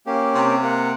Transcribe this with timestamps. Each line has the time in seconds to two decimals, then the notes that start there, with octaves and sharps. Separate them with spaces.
0.06 A#3 C#4 G4
0.35 C3
0.63 A#3 F#5